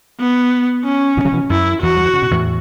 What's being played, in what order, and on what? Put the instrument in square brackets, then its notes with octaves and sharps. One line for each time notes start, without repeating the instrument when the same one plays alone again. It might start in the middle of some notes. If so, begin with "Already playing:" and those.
[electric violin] B3
C#4
[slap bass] B2 E3
C#3 F#3
B2 E3
[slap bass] F#2 [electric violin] E4
[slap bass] E2 [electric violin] F#4
[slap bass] F#3
E3
C#3
B2
E2 A2